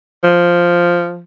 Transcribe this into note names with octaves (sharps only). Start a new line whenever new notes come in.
F3